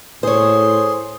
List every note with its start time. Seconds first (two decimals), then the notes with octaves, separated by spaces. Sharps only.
0.23 A2 G#4 C5 C#5 C6